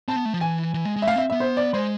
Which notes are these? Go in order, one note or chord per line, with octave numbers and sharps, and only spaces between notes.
C4 A5
B3
A3
F3
E3 G#5
E3
G#3
G#3
E5
A3 F5
C4 E5
B3 E5
C5
D5
G#3 C5